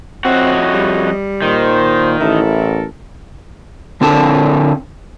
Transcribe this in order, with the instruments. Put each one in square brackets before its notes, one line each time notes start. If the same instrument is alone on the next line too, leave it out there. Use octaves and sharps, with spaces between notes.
[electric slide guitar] F2 F#4 F#5 [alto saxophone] C4 [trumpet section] E4 C#5 D#5
[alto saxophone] G3
[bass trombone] A#2 [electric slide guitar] D#3 [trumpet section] C5
[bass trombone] A1 [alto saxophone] E4 [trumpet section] A4 A#4
[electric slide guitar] D3 C4 D4 A4 A#4 A5